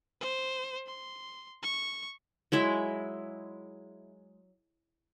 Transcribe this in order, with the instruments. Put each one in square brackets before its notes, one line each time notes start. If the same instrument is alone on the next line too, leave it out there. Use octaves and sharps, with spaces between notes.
[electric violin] C5
C6
C#6
[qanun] F#3 G#3 E4 E5